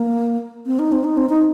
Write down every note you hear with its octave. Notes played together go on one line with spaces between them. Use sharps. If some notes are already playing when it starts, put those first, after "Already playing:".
Already playing: A#3
C4
D#4
C4
D#4
C4
D#4